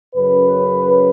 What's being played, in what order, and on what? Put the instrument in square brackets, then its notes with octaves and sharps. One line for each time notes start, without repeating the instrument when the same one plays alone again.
[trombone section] F#2 C#3 F#3 B4